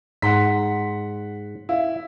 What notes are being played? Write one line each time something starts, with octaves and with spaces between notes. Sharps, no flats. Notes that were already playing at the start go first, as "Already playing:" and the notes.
G#2 F#5 A#5 C6 B6
E4 F5